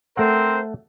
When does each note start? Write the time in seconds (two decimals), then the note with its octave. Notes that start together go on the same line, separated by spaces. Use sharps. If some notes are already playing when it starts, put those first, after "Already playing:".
0.17 A3 C4 A#4 C5 F#5